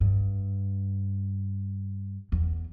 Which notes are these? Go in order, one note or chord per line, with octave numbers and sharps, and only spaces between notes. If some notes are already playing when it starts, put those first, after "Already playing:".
G2
E2